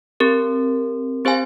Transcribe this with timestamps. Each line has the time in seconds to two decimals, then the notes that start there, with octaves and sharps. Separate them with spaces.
0.20 C4 G4 A#4
1.25 C4 G4 C5 F5 G#5